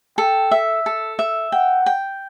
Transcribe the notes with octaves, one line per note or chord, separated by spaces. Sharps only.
A4 G5
E5
A4
E5
F#5 G5
G5